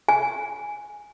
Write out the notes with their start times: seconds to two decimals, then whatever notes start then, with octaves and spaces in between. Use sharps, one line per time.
0.09 G#5